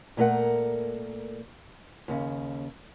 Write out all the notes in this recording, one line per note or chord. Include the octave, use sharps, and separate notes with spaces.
A#2 A3 A#4 F#5
D#2 C#3